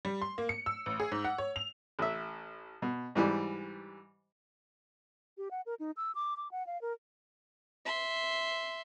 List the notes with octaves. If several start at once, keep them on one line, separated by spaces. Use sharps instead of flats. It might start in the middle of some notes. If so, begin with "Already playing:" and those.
G3
C6
A#3
C#7
E6
A1
G#4
G#2
F#5
C#5
F7
A1 E5
B2
G#2 E3 G3
G4
F#5
A#4
D#4
E6
D6
D6
F#5
F5
A#4
E5 C6